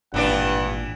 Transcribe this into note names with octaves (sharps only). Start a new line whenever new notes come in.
G#1 G2 A#2 E3 D4 D5 F#5